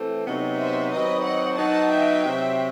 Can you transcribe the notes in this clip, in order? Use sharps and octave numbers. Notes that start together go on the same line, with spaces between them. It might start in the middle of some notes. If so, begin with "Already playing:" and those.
Already playing: E3 A3 C4
C3 F#3 B3 D#4
C5 E5
D#3 F#3 C4 B4 D#5
D#5 F#5
F#3 B3 D#4 F#5 A5
E5 G5
C3 F#3 C4